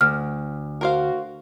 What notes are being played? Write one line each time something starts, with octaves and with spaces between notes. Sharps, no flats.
D2 F6
F#4 A#4 C5 F5